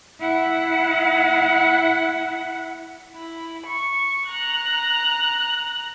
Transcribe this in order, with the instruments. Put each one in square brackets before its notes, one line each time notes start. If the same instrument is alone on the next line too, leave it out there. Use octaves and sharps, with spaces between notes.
[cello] E4 F#5
[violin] E4
C#6
A#5 F#6